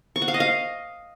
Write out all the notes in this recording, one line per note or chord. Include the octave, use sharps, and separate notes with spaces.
C#6
F#5
F5
D#5
F5